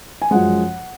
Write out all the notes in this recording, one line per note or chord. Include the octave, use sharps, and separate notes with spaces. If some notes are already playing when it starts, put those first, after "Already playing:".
G#5
F#2 F3 G#3 F#5